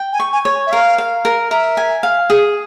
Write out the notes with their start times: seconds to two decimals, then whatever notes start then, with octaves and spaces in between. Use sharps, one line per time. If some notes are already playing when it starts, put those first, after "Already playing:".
Already playing: G5
0.13 G#5
0.20 C#6
0.33 G#5
0.45 C#5
0.67 E5
0.72 A#4 F5
0.98 F5
1.25 A#4
1.51 A#4 E5
1.77 G#5
2.03 F5
2.30 G#4